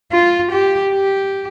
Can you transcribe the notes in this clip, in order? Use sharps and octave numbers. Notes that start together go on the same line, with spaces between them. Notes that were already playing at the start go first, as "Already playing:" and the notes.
F4
G4
G4